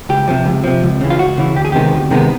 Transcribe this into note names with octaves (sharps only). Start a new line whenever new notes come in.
C#2 G4
C3 F3
C#2
C3 F3
C#2
C#3 E3
F4
C#2 F#4
C#3 E3
D2 G4
G#4
C3 D#3 G#3 B3 G4
D2
C3 D#3 G#3 B3